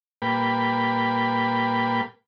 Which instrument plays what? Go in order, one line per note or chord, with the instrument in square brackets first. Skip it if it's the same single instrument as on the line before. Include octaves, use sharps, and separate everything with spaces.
[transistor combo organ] A#2 G3 A#3 B4 G5 B5